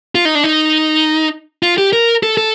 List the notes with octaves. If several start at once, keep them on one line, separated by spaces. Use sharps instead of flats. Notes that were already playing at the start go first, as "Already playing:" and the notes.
F4
D#4
D4
D#4
F4
G4
A#4
A4
A4